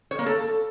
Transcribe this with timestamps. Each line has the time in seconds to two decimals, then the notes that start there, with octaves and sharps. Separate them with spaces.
0.11 C#5
0.19 A#3
0.26 A4